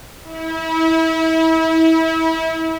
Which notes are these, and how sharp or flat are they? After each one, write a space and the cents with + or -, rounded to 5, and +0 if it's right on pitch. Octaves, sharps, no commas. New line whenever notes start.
E4 -30